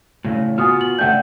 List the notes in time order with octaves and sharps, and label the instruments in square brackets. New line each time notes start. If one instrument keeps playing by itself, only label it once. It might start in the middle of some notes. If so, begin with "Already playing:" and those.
[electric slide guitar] A2 C#3
[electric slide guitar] B3 F4 F#4 [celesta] G#5 D#6 F6
[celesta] F#7
[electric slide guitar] C#3 A3 D4 [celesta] F#5 G5 G6